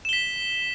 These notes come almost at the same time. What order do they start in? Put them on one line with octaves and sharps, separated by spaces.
E7 G7 B6